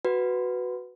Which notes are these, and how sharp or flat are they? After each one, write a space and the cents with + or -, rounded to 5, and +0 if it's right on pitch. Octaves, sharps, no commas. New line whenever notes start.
F#4 +0 B4 +5